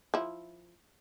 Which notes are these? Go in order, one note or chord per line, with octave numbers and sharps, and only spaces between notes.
F3 E4